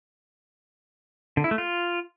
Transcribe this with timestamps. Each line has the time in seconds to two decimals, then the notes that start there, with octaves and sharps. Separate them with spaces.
1.37 D3
1.44 E4
1.51 A3
1.58 F4